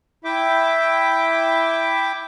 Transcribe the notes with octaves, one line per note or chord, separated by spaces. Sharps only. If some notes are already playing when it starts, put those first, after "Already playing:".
E4 E5 G5 D6